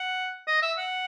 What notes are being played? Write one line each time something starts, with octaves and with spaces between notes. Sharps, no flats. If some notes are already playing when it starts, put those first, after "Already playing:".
Already playing: F#5
D#5
E5
F#5